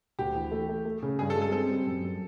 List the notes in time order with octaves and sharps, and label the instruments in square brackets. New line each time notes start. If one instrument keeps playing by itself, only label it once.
[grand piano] D2 [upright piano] G4
[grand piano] E3
A3
A3
A3
C#3
[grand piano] G2 [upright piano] G#4
[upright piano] A4
[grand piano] G#3
[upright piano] A4
[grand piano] C4 [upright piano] A4
[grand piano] G3
F#2
F#2